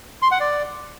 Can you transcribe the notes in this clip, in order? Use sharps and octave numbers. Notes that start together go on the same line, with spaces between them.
C6
F#5
D5